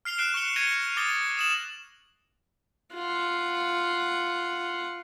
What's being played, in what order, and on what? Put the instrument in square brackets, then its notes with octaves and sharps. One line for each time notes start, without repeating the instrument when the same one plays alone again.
[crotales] F6 C7 F7 G7
F6 F#6 C7 D7 E7
C#6 F#6 C#7 G7
G#6 A#6 C#7 D#7 F7 G7
D6 D#6 A6 A#6 D#7 G7
D#6 E7 F#7
[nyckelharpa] F4 F#5